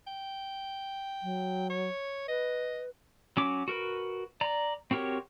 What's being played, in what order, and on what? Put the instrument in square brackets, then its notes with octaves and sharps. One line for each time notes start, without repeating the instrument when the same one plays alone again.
[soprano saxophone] G5
[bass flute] F#3
[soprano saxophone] C#5
[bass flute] B4 [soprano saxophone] D#5
[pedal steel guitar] F#3 C#4 D6
F#4 A#4 B4
D5 A#5
C4 F#4 G4 A#4 C#5